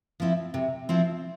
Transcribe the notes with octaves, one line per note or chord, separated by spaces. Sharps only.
F3 C4 E4
C3
F3 C4 E4